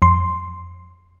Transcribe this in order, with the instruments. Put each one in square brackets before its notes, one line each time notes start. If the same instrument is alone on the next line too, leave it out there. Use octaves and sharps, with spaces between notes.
[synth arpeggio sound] F2 C6